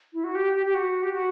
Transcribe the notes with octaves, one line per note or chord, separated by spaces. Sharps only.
E4
F#4
G4
G4
G4
F#4
G4
F#4